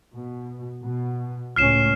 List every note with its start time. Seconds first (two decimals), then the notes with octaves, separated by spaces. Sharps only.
0.14 B2
0.84 B2
1.56 C#2 A2 C#4 F6 C7 E7